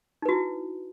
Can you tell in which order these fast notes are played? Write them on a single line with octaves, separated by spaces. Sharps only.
D#4 B4 F#4 E4